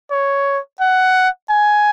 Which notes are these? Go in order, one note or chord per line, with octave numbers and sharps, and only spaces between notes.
C#5
F#5
G#5